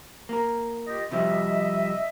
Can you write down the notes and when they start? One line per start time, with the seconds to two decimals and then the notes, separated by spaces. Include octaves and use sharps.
0.29 A#3 A#4
0.87 F4 G4 D#5
1.11 C3 F3 G3 D#5 E5